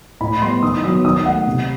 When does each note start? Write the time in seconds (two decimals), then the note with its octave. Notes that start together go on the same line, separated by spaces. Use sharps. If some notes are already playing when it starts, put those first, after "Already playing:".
0.21 A2 B5
0.42 G3 B3 C6
0.62 D#3 D#6
0.84 F#3 B3 D#6
1.04 D#3 D#6
1.25 A3 F#5
1.47 C3